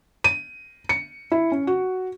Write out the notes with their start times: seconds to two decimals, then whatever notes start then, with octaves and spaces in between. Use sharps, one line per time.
0.24 D#7
0.89 C#7
1.32 E4
1.52 C#4
1.67 F#4